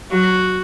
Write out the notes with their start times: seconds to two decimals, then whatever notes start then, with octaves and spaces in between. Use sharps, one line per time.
0.11 F#3 F#4